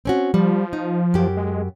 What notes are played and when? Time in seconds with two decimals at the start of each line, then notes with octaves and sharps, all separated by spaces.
0.05 C4 C#4 F#4
0.34 F3 G3
0.73 D#4
1.14 F#2 G4
1.37 G#3